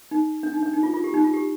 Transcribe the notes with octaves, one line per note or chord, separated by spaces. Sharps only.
D#4
D4
D#4
D4
D#4
F4
F4
G4
D#4
F4
G4